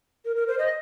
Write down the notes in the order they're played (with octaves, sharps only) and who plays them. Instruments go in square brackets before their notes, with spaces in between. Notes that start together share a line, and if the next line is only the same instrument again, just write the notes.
[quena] A#4
A#4
C5
D#5